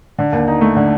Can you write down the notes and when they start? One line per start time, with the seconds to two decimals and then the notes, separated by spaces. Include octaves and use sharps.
0.18 D3
0.32 D#2
0.48 D#4
0.61 A3
0.76 D3